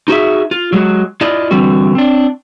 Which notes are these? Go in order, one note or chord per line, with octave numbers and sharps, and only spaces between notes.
D#4 F#4 G#4 E5
F4
F#3 G#3 F#4
E4 F4 D5 D#5
D3 E3 G3 C4 F#4
C4 D4